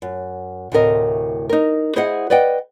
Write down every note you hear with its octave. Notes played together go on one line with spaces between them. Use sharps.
F#2
D2 A2 C3 E4 A#4 D#5
D#4 A#4
E4 G#4 C5 D#5 E5 F#5
B4 D5 D#5 F#5 G5